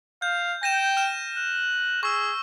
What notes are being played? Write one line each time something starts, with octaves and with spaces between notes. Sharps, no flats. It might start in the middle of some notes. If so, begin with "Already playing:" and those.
F5 G6
G5 A#6 D#7 E7
F6 E7
F#6
G#4 C#6 E6